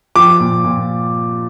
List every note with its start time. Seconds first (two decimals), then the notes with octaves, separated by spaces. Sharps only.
0.15 F3 D6
0.40 A#2
0.64 A#2